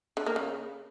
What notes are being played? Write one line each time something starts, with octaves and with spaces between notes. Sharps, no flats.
D3
A#3
C#3